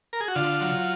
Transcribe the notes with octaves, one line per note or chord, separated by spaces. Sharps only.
A#4
G#4
F#4
D3 F4
F#3